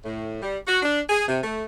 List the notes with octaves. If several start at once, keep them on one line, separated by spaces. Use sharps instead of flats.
A2
G3
F#4
D4
G#4
C3
A3